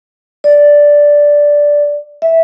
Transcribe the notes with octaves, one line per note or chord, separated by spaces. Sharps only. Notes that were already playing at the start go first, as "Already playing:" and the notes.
D5
E5